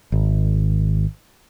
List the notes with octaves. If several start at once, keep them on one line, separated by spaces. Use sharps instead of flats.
G#1